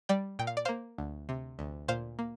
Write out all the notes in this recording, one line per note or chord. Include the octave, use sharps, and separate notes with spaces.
G3 D5 G5
A#2 G5
F5
D5
A#3 C5 F5
D2
C3
D2
A#2 C5 F5
A#3